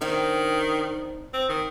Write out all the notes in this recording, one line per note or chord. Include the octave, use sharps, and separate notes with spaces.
D#3 C4 D4 D#4
C4
D#3